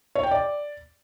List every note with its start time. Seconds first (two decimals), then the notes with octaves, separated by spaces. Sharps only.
0.15 C#5
0.23 G5
0.31 D5